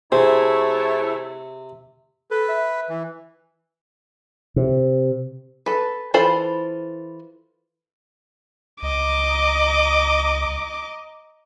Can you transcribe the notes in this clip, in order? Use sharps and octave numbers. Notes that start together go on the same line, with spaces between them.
C3 A3 E4 G#4 C5 C#5
A4 B4
E5
E3
C3
A4 B4
E3 F4 A4 C5 B5
C#2 D#5 A#5 D6